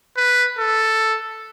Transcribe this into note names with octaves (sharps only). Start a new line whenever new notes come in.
B4
A4